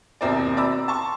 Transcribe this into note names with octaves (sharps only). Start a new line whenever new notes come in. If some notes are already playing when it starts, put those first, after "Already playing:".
D#2 B2 C4 E4 A#4 D5
D5 A#5 B5 E6
A5 C6 C#6